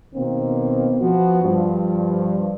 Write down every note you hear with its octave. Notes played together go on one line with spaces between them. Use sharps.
B2 D#3 A#3 C4
F3 B3 F#4
G2 F3